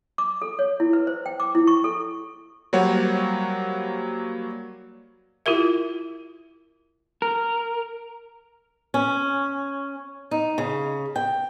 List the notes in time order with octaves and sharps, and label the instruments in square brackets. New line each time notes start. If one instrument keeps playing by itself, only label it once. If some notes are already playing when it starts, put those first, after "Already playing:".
[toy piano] D6
A4
C#5
E4
B4
C5
G5
D6
E4
C#6
A4
[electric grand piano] F#3 G3 A#3 C5 C#5 F#5
[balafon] E4 F4 G4 A#4 E5
[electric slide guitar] A#4
[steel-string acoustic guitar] C#4
D#4
C#3
G5